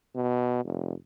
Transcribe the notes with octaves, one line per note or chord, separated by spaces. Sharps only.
B2
F1